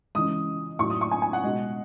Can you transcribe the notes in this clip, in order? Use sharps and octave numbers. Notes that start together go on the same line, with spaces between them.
C#3 E3 G#3 D#6
A2 F#3 C#6
D#6
C#6
G#5
G#5
F#5
B2 G#3